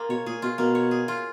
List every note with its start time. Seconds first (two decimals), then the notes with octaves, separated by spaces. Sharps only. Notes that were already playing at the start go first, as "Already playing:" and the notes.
Already playing: A#3 F4 G#4
0.09 B2 C#5
0.26 A#2 G#4
0.42 B2 F4
0.58 B2 A#3
0.75 C#5
0.91 G#4
1.08 F4